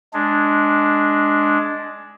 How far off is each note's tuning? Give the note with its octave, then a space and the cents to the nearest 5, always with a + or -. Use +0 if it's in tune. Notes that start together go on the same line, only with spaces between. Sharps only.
G#3 +10 D4 +0